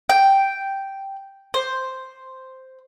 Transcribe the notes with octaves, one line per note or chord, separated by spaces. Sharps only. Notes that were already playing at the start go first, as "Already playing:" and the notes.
G5
C5